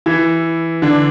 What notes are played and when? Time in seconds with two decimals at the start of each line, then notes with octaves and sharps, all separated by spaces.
0.06 E3 E4
0.82 D3 D4